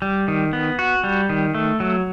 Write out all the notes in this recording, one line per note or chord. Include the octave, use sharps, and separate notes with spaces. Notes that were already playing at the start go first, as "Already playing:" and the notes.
G3
D#3
B3
F#4
G3
D#3
A3
F#3